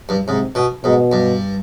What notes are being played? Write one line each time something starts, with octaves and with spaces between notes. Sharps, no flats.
G2
G#2 C3
B2
G#2 B2
G2